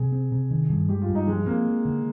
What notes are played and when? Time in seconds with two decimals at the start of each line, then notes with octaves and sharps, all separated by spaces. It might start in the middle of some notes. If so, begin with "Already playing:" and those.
Already playing: C3 G#4
0.12 C4
0.32 C3
0.51 D#3
0.69 G2
0.89 G#3 G4
1.02 F4
1.09 G2
1.15 D#4
1.28 F3 G#3
1.46 A#3 C4
1.66 G#3
1.85 D3